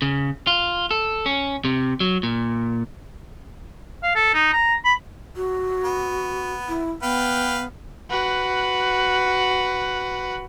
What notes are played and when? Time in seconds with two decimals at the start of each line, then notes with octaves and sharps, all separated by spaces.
0.02 C#3
0.47 F4
0.91 A4
1.26 C#4
1.65 C3
2.00 F#3
2.23 A#2
4.03 F5
4.15 A4
4.34 D#4
4.53 A#5
4.85 B5
5.36 F#4
5.84 B3
6.68 E4
7.02 B3 B4 F5 G5
8.10 F#4 B4